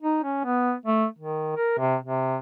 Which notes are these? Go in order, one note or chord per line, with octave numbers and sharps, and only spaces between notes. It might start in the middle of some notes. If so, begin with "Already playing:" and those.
D#4
C#4
B3
A3
D#3
A#4
C3
C3